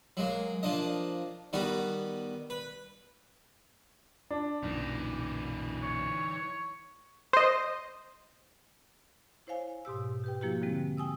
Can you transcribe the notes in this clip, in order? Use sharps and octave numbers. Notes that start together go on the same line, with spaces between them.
F#3 G#3 A#3
F3 A#3 D4 D#5
D#3 G3 B3 F#4
B4
D4
B1 F#2 A#2 E3 D#4
C#5
C5 D#5
E4 C5 C#5 F5 G#5
G#2 B2 G4 E6
G4 B4 G5
F3 A#3 E4 F#4 G4
D3 F3 G3 G#3 C4
G5 G#5 D#6 E6